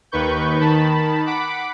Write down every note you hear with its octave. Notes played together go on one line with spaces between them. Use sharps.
D#2 D#3 B4 C#6 G6
D#3 A5 B5
F#5 B5 D6 B6 D7